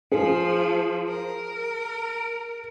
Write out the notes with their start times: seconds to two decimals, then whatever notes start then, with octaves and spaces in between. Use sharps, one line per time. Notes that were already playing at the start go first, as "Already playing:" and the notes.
0.12 F3 G#4
1.09 A#4